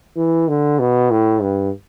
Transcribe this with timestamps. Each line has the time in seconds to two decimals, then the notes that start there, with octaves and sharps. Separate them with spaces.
0.17 E3
0.48 D3
0.79 B2
1.11 A2
1.42 G2